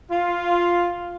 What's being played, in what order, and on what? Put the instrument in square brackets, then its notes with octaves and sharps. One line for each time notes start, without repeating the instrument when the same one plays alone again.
[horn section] F4